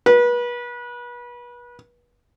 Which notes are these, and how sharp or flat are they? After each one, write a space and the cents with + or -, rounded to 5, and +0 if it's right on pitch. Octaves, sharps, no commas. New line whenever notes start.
B4 -35